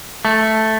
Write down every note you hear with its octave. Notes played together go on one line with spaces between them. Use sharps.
A3